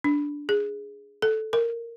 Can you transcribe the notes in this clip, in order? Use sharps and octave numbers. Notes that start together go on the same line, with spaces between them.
D4
G#4
A4
A#4